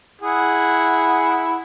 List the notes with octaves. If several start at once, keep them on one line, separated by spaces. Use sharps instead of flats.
E4 G#4 F#5